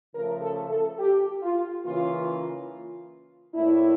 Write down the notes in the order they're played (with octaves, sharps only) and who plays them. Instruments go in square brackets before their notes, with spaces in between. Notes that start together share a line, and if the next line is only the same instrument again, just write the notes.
[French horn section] C#3 F3 A3 A#4
A4
A4
G4
F4
C#3 E3 A#3 F4
A2 F3 A#3 D4 E4